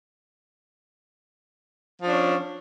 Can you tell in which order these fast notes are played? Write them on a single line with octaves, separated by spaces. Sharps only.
F3 D4 C#4